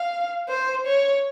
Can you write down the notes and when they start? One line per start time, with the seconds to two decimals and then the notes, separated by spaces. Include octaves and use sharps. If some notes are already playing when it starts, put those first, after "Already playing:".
Already playing: F5
0.48 C5
0.86 C#5